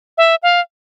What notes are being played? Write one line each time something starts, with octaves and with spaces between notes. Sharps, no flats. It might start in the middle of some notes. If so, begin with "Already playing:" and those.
E5
F5